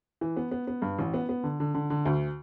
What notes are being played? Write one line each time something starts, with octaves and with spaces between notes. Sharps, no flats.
E3
B3
B3
B3
G2
A1
B3
B3
D3
D3
D3
D3
D2